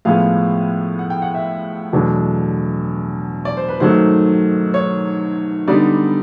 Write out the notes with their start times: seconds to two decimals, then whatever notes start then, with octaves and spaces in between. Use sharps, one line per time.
0.05 A2 F3 G#3 B3 F5
0.99 F#5
1.10 G5
1.22 F#5
1.34 E5
1.93 E2 B2 F#3 A3 D4
3.45 D5
3.57 C5
3.68 B4
3.80 G#2 D#3 F#3 A3 C5
4.74 C#5
5.68 D3 G3 B3 D#4 D5